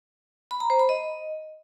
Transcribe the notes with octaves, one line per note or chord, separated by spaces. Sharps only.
B5
A#5
C5
B5
D#5